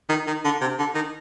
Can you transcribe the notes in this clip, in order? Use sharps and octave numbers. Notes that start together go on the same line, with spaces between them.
D#3
D#3
D3
C3
D3
D#3